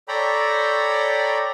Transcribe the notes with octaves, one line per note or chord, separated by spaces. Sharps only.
A4 C#5 D5 G5 A#5 B5